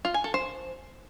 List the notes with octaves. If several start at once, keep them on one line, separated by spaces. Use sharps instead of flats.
F4
G#5
A4
C5